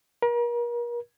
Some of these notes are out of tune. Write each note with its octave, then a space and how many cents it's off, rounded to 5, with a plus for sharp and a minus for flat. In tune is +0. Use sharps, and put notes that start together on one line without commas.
A#4 +40